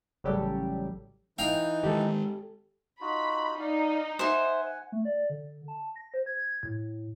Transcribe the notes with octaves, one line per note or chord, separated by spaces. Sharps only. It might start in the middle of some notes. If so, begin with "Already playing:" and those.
A1 C#3 F#3 G3 G4 A4
E3 D#4 F5 G5 A#5
D#3 G#3 G4 A4
D#4 F4 F#4 B5
D#4 D5 F5
C5 E5 F#5 G#5
A3
D5
D3
A5
A#6
C5
G#6
A2